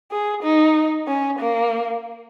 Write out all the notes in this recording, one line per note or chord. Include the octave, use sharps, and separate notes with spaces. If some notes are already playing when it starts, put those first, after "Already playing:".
G#4
D#4
C#4
A#3